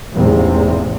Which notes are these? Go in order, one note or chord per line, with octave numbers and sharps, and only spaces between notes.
A1 E2 G#2 C3